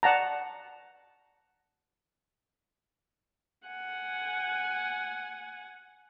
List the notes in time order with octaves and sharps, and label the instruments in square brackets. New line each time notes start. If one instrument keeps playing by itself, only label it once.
[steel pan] D5 F#5 A5 A#5
[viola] F#5 G#5